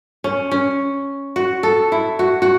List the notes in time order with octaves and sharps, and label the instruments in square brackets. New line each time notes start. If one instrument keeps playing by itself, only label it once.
[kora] C#4
C#4
F#4
A4
E4
F#4
F#4